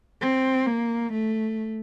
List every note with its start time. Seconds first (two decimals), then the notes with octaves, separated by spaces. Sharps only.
0.21 C4
0.67 A#3
1.13 A3